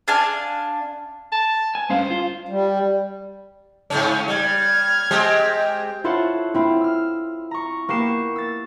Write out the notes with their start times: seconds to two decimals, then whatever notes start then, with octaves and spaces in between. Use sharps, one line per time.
0.08 D4 F5 G#5 A5
1.32 A5
1.75 G#5
1.90 G2 C#4 C5 F5
2.10 F4
2.48 G3
3.90 G#2 C#3 C#4
4.28 G3 F6 G#6
5.11 G#3 C4 G4
6.04 E4 F4 A4 C5 C#5 F#5
6.54 C4 E4 F4
6.81 E6 F6
7.51 A#5 C#6
7.89 A#3 B3 G4 C#6 C7 E7
8.36 E6 A6